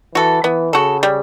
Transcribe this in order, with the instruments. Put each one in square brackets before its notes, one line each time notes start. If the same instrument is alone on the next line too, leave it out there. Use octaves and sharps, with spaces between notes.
[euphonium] E3 [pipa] F#4 A4
[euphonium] E3 [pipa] B3
[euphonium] C#3 [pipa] F#4 A4
[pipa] G3